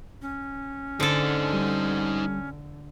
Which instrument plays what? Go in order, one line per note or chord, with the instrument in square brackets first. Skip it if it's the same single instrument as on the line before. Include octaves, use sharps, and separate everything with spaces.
[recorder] C#4
[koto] D3 A4 [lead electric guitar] D#4 C5
[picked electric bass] G3